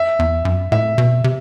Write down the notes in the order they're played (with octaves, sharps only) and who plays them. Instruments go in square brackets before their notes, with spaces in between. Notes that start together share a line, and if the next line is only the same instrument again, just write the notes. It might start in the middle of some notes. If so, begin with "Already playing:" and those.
Already playing: [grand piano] E5
[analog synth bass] E2
F#2
[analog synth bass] A2 [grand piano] E5
[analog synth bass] B2
C3